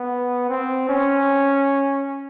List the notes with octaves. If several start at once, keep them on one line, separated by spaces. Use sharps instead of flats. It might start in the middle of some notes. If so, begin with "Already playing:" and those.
Already playing: B3
C4
C#4